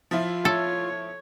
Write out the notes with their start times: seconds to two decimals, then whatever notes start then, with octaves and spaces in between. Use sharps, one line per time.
0.11 F3 E4 F4
0.45 A4 C#5